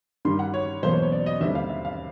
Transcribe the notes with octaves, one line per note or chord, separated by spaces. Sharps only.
G2 D#3 G3 C6
F#5
C#5
E2 B2 F#3 A#3 C5
C#5
C#5
D5
D#5
D#2 D3 G3 C4 E5
F5
E5
F5